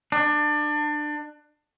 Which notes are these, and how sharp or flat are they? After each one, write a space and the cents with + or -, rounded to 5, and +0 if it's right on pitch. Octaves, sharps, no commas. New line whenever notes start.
D4 +25